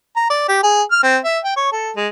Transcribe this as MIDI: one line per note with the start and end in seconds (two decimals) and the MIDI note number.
0.16 0.28 82
0.30 0.45 74
0.49 0.59 67
0.63 0.83 68
0.91 1.02 89
1.03 1.18 60
1.24 1.39 76
1.44 1.56 79
1.57 1.70 73
1.72 1.91 69
1.96 2.08 56